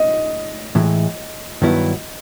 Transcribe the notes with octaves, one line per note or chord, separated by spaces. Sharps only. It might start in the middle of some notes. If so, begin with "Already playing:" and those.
Already playing: D#5
A2 E3 G#3
G2 D#3 F#3 B3 E4